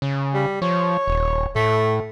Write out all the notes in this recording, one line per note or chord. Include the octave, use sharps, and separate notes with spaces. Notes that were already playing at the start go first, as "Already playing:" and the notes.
C#3
G3
F3 C#5
D#1
A2 A3